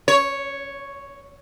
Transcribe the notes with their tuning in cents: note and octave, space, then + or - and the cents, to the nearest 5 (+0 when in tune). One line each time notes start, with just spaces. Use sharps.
C#5 +0